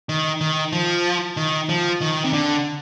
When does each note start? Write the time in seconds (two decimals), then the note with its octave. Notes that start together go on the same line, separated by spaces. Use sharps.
0.09 D#3
0.41 D#3
0.72 F3
1.37 D#3
1.69 F3
2.01 D#3
2.24 C3
2.33 D3